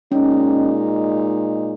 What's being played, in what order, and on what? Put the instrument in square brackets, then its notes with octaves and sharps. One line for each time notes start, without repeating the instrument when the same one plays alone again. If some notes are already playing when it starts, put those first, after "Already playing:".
[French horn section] A#2 G#3 D#4 [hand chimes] C#4